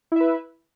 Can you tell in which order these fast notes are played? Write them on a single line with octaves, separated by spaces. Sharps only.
E4 E5 B4